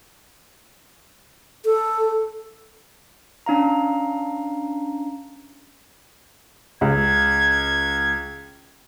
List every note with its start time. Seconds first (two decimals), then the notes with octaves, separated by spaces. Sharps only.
1.65 A4
3.46 C#4 D4 F5 A#5
6.81 C#2 G#6